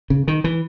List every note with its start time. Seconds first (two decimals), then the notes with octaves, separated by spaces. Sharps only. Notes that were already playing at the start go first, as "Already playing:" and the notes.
0.10 C#3
0.28 D#3
0.44 E3